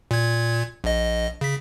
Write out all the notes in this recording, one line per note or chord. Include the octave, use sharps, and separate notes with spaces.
A#2 G#6
A#1 D#5
C#3 B6